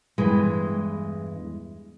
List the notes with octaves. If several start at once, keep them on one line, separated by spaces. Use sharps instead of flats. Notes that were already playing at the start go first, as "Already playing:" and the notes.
E2 G2 E3 G#3